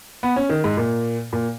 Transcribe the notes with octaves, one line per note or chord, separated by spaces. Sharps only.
B3
C#4
D#3
G#2
A#2
A#2